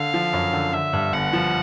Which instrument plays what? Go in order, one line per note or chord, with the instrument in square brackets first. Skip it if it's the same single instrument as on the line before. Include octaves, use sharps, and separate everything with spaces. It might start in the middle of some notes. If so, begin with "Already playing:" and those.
Already playing: [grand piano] D3 [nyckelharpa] F5
[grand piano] F3
F#2
D3
[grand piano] D3 [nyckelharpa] E5
[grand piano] G2
[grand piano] G1 [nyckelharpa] F#5
[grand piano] F3